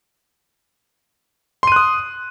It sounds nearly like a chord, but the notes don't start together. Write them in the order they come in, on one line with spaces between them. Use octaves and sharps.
C6 D#7 F#6 D#6